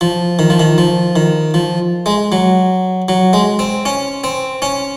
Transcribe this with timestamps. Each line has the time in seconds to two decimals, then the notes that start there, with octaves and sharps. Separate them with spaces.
0.01 F3
0.39 D#3
0.50 F3
0.60 D#3
0.78 F3
1.16 D#3
1.54 F3
2.06 G#3
2.32 F#3
3.09 F#3
3.33 G#3
3.59 C4
3.85 C#4
4.24 C4
4.62 C#4